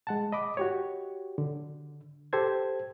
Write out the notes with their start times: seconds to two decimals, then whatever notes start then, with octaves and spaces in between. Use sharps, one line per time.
0.07 G#3 F#5 A5
0.32 D#5 B5 D6
0.57 F#4 G4 C#5
1.38 D3
2.33 G4 A4 C5 G#6